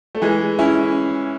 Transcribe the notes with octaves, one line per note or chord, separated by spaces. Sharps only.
A3
E3 G#3
C#4 E4